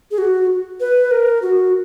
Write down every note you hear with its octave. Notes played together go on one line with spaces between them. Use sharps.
G#4
F#4
B4
A#4
F#4